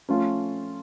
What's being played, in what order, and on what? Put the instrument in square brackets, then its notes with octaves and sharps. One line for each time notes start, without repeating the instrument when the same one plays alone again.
[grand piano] F3 A3 C#4 F4